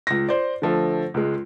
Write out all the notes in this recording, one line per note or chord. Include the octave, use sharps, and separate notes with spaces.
C#2 A#6
C5 D5
D3 F3 A3
C#2 G#3